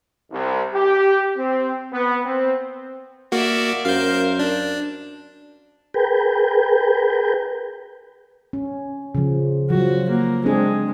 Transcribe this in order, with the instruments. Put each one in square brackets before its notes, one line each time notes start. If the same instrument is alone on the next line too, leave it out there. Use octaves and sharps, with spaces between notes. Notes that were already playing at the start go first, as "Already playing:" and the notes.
[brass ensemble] C2
G4
C4
B3
C4
[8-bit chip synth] A#3 F#4 [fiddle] D5 E5
[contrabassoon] F#2 [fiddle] A#4 C5 [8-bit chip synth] F5 G6
[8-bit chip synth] D4
[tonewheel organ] G#4 A#4 B4 G5
[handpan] C#4
C#3 F3
[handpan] F3 F#3 [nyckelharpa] F#4
[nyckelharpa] A#3
[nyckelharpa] G#3 [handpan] C4 D4 G#4